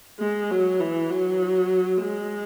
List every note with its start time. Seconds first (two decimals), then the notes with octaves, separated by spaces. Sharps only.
0.20 G#3
0.51 F#3
0.80 E3
1.10 F#3
2.01 G#3